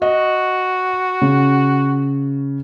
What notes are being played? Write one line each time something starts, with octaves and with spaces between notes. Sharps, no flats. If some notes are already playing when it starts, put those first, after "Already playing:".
F#4 D#5
C#3